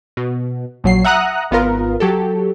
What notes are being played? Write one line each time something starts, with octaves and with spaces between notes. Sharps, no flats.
B2
A#1 F#3 C7
E5 F#5 A#5 D#6 F#6
G#1 B3 F4 A#4
F#3 G4 A4